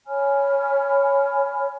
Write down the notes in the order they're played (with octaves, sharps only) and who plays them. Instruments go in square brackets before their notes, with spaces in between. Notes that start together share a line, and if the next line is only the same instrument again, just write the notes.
[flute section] C#5 G#5 B5 F6